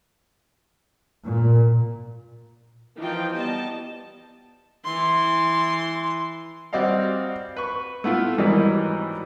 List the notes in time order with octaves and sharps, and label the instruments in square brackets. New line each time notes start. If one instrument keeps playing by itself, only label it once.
[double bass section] A#2
[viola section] E3 F3 D#4 F4 G5
G3 B3 D#5 A5
[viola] E3 C6
[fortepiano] G3 C4 F#4 D5 D#5 F5
B4 C#6
A3 B3 E4 F4
G#2 D#3 E3 F#3 G3 D#4